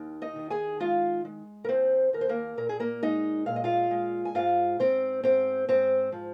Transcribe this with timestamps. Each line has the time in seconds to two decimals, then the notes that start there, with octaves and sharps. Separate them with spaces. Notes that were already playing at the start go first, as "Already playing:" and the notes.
Already playing: D#2 D#3
0.22 D#4 D#5
0.36 D#3
0.50 G#4 G#5
0.80 G#3 F4 F5
1.25 G#3
1.65 A#4
1.69 D#2 C4 C5
2.13 D#2 A#4
2.21 C5
2.29 A#3 A#4
2.57 A#2 A#4
2.69 G#4
2.80 A#3 A#4
3.03 G#3 D#4 D#5
3.46 A#2 F5
3.56 D#5
3.64 F4 F5
3.91 G#3
4.25 G#5
4.35 G#2 F4 F5
4.79 G#2 C4 C5
5.24 G#2 C4 C5
5.69 G#2 C4 C5
6.12 F3